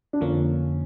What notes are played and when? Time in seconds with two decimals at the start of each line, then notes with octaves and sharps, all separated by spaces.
0.13 D4
0.21 F2 D3 F3 A#3 C#4